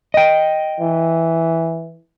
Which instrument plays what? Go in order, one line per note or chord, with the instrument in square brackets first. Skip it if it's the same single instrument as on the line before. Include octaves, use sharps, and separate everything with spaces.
[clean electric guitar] D#5 G5
[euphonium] E3